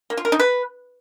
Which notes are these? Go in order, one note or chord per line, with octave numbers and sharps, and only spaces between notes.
A#3
F4
A#4
D#4
B4